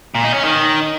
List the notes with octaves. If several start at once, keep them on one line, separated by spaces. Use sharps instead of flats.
A#2
D#4
C#4
D#3